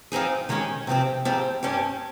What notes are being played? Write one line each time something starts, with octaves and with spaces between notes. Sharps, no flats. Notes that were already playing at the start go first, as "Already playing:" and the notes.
F3 C4 D#4 G#4
D#3 G#3 C#4 G4
C3 F3 C4 G4
G#2 F3 C4 G4
G2 G3 C#4 G4